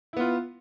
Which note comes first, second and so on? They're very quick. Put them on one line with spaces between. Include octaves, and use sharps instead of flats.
E4 B3 F4